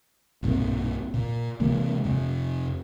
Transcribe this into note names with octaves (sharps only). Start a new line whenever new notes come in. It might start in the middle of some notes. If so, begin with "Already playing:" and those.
B1 G2 A#2 C4
A#2
C3 E3 G#3 A#3
F2 C3